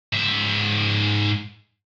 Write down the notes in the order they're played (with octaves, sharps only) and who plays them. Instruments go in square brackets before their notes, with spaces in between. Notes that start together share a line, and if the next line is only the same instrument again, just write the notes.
[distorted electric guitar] G#2 E5